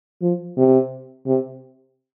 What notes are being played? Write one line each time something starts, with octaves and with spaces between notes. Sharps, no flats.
F3
C3
C3